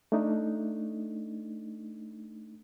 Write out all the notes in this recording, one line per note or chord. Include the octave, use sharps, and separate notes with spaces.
A3 D4 D#4